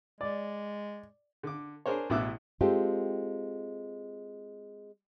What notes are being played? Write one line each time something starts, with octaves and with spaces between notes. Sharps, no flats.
G#3 D5
D3 D6
D4 G#4 A#4 C5 C#5
A1 B2 E4 D6 E6 F#6
G#3 C4 F4 G4 A4